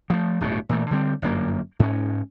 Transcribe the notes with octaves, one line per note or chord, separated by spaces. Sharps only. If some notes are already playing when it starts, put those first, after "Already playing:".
F3 G#3 A3
D1 G1 B2 A3
A#2 E3 A3
D3 G3 C4
G1 F#2 A#3
G#2 C#4